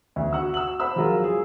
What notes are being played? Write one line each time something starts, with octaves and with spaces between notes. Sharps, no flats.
D2
F#4 F#5 E6
E6 F#7
C5 F#5 B5 E6
F3 F#3 G#3 F4 A#4
G#4